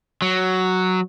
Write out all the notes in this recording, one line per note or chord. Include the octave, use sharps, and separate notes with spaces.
F#3